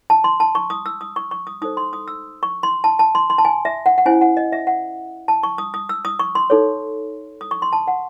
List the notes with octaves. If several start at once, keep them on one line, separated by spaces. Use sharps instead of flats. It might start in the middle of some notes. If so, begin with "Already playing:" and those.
A5
C6
A5
C#6
D#6
E6
D#6
C#6
C#6
D#6
D#4 A4 C5 D#6
C6
D#6
E6
C#6
C6
A5
A5
C6
C6
A5
G#5
E5
F#5
F#5
C#4 E4 C5 G#5
F#5
D#5
E5
F#5
A5
C#6
D#6
D#6
E6
D#6
C#6
C6
D#4 A4 C#5
D#6
C#6
C6
A5
F#5